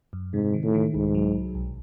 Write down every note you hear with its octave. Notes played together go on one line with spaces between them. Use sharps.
F#2
G#2 C3
D#3
A2
D#3
C2 G#2
F#3
C2
B1